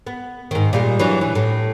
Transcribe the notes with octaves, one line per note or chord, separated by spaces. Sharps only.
B3
G#2 D#3
A#2 G3 G#3
E3 F#3 D4
E3
A2